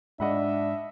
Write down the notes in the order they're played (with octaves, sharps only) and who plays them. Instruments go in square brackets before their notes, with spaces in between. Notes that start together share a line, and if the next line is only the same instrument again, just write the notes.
[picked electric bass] G#2 G#3 [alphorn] D4 [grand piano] D#5 F#5 B5 [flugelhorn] E5